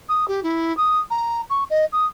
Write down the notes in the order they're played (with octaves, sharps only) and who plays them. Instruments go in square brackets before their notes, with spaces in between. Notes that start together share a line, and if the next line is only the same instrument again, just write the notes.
[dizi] D#6
G4
E4
D#6
A#5
C#6
D#5
D#6